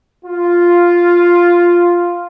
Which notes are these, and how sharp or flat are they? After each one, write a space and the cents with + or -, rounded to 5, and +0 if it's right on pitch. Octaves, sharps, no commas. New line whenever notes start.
F4 +0